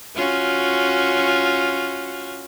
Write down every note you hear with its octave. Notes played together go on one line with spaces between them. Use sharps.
C#4 F4 F#4